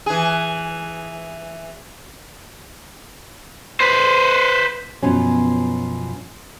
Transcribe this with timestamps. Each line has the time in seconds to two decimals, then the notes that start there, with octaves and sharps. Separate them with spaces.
0.06 E3 G#4
3.80 B4 C5
5.03 F#2 B2 F3 B3 C#4